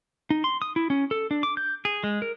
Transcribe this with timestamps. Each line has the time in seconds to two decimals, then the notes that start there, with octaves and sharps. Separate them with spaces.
0.30 D#4
0.44 C6
0.62 D#6
0.76 E4
0.90 C#4
1.11 A4
1.31 D4
1.43 D6
1.57 G6
1.85 G#4
2.04 G#3
2.22 A#4